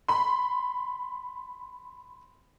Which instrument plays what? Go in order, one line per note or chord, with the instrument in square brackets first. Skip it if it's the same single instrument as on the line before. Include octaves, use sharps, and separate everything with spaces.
[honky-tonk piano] B5 C6